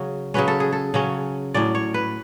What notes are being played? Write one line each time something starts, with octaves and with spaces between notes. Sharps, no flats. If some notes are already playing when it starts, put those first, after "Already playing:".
Already playing: C#3 F#3 C#4
C#3 F#3 C#4 B4
A4
G#4
A4
C#3 F#3 C#4
A2 F#3 C#4 D5
C#5
B4